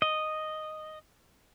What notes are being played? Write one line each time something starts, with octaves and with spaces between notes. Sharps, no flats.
D#5